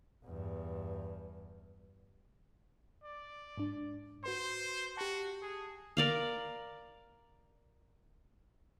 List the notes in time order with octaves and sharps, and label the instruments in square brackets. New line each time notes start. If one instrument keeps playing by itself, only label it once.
[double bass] E2 G2
[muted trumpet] D5
[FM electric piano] G#2 D4
[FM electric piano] F#4 B4 C6 [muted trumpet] C5
[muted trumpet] F#4 [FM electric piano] G4 A5
[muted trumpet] G#4
[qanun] A#4 D5 F5